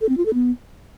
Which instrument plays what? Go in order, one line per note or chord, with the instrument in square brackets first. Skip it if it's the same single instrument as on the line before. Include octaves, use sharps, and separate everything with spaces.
[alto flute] A4
C4
F4
A4
B3